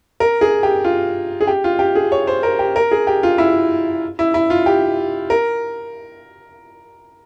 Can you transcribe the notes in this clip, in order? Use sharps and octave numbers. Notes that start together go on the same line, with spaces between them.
A#4
G#4
G4
F4
G#4
G4
F4
G4
G#4
C#5
C5
A#4
G4
A#4
G#4
G4
F4
E4
E4
E4
F4
G4
A#4